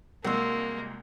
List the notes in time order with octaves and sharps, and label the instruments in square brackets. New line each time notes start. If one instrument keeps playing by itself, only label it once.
[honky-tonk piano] C2 G#3 [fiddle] A#3 [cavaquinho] F#4 C6 [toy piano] A#4 E6